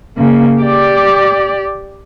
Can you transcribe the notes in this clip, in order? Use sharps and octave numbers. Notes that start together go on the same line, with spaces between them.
C#3 A#3
G4 D5